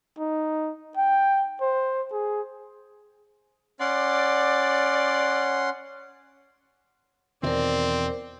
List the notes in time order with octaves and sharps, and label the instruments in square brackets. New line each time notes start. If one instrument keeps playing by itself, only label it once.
[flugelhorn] D#4
G5
C5
G#4
[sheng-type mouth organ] C#4 F#5 C6 [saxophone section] D5
[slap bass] E2 B2 D#3 [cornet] C4 [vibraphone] A#4 C5 [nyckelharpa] D5